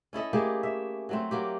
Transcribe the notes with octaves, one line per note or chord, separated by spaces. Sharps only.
C#4 E4 A4 D#5
A3 A#3 G4 G#4
E5
F#3 A3 C4
F#3 A#3 G4